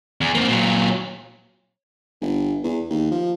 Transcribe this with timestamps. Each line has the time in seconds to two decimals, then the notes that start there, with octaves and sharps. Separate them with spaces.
0.21 E2
0.35 A#3 C4
0.48 A#2 F#3
2.22 G1
2.64 E2
2.90 D#2
3.11 F3